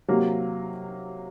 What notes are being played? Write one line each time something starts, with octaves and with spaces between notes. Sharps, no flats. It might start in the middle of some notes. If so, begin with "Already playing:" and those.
C3 F#3 A#3